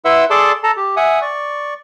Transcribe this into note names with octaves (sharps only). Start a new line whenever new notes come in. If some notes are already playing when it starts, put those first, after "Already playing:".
E4 B4 E5 F#5 C6 E6
G#4 A4 D5 A5 C6 D6
A4 A5 A#5
G4
E5 F#5 G#5 D#6
D5 C#6